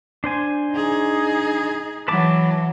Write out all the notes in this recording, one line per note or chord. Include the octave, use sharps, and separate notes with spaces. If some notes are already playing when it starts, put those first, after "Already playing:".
D4 C5 G#5
D#4 G#4
E3 F#3 B4 A5 D6